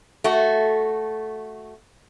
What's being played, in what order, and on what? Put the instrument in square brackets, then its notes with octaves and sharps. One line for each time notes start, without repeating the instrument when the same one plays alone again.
[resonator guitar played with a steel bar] A3 F#4